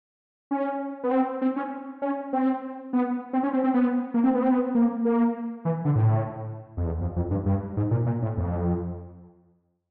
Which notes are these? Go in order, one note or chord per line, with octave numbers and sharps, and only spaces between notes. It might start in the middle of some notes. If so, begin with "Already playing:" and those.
C#4
B3
C4
C4
C#4
C#4
C4
B3
C4
C#4
C4
C4
B3
A#3
C4
B3
C4
B3
A#3
A#3
E3
D3
A2
F2
E2
F2
F2
G2
G2
G#2
A#2
A#2
A2
F2